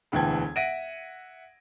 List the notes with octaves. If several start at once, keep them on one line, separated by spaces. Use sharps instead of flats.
E1 D2 E3 G5 A5 G#6
E5 F#5 A#6 D7 D#7